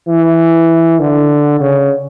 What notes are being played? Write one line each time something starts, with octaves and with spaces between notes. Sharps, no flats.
E3
D3
C#3